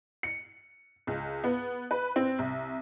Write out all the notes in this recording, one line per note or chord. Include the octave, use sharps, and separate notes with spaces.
C#7
C#2
B3
B4
C4
C2